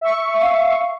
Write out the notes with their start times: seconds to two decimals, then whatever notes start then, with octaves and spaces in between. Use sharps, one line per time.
0.01 E5 C#6
0.41 F5